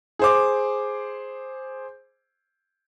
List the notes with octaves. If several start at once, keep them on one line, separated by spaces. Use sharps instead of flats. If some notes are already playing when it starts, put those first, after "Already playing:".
G#4 C5 D6